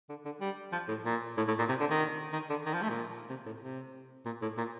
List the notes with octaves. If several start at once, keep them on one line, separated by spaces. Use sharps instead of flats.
D3
D3
G3
F3
A2
A#2
A2
A2
A#2
C3
D3
D#3
D#3
D3
D#3
F3
A3
A#2
C3
A2
C3
A#2
A2
A#2